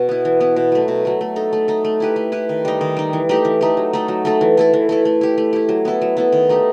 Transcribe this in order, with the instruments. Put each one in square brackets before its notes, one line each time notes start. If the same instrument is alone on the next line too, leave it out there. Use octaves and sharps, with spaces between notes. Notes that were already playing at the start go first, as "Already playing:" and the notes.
Already playing: [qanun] B2
B3 E4
E3
B3 E4
B2
F#3 A3
B2
F#3 A3
A3
D#4 A4
A3
D#4 A4
A3
E4 G4 B4
A3
E4 G4 B4
D#3
G3 D#4
D#3
G3 D#4
E3
A3 D#4 G4
E3
A3 D#4 G4
F#3
A3 D#4 A4
F#3
A3 D#4 A4
E3
A3 E4 A4
E3
A3 E4 A4
A3
E4 G4
A3
E4 G4
F#3
B3 E4 A4
F#3
B3 E4 A4
D#3
A3 D#4 G4